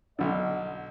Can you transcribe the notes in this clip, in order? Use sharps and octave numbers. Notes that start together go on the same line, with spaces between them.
B1 D3 D#5